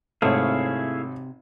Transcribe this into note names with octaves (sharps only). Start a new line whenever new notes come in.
G#1 C3 A3 E4 G#4 C#5 F5